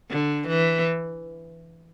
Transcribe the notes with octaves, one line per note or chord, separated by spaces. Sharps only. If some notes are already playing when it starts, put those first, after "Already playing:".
D3
E3